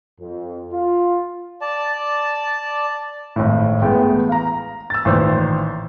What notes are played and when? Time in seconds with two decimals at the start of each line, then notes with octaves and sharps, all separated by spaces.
0.20 F2
0.72 F4
1.61 D5 A5
3.36 G#1 A2
3.82 A1 G#3 A3 B3 G5
4.29 F5 A#5
4.90 E6 A6
5.05 A1 A#2 D#3 C5 E6